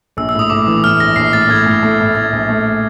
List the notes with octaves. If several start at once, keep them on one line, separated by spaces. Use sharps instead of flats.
A#1 E6
E6
A2
D#6
A2 D6
E3
A2 F6
A#1 A#6
A#1 C7
A2 A6
A2 G#6
A2
A3
A2
A2 G#6
A#1
A3